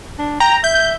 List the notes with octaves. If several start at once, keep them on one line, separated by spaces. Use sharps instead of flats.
D4
G5 A#5
E5 G6